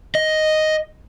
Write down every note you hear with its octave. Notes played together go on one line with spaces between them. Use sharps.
D#5